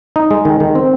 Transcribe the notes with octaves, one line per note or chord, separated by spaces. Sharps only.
D#4
G#3
D#3
D#3
C4